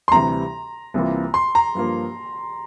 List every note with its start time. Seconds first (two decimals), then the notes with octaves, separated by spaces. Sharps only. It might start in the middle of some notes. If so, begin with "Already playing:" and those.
0.08 C6
0.12 D2 C3 E3 G3 A#5
0.94 C2 C3 E3 A#3 F4
1.34 C6
1.55 A#5
1.75 G2 F3 A#3